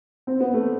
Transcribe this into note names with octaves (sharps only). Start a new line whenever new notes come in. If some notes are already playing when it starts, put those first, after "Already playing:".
C4
B3
A3